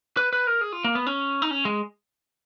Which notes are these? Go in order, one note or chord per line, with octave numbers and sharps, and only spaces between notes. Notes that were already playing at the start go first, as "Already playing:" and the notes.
B4
B4
A#4
G#4
F4
A#3
B3
C#4
D#4
C#4
G#3